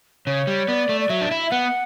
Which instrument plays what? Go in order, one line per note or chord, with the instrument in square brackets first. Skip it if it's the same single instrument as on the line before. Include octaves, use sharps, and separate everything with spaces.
[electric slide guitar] C#3 [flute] C#5
[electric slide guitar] G3
[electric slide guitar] B3 [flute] D5
[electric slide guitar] A3
[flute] D5
[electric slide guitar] F#3 [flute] E5
[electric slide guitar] D4
E4
[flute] E5
[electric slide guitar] B3 [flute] F#5